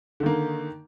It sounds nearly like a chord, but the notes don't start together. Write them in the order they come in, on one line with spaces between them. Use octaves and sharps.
D3 D#3 A#3